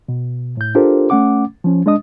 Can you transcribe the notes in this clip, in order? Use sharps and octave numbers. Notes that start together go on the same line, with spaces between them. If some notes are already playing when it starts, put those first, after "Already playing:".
B2
A2 G6
D4 F4 G4 A4 A#4 C5
A3 C#4 F#5 D6
F3 C#4
G#3 D4 D#5 D#6